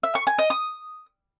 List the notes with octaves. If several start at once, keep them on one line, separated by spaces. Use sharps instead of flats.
E5
C#6
G#5
D#5
D#6